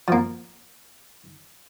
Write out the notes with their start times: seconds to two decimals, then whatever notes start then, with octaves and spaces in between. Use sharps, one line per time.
0.08 F3 A#3